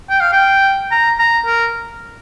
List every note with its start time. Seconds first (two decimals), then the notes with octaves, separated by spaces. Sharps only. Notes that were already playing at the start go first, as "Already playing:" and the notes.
0.10 G5
0.20 F5
0.33 G5
0.91 A#5
1.19 A#5
1.46 A#4